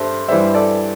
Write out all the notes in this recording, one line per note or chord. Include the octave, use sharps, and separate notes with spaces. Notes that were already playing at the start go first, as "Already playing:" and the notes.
Already playing: G2 A4 C5 E5 C6
G2 E3 G3 C5 E5
A4 D5